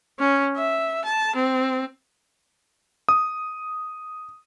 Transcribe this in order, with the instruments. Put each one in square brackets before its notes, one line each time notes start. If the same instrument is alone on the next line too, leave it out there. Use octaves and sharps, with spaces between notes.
[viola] C#4
E5
A5
C4
[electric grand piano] D#6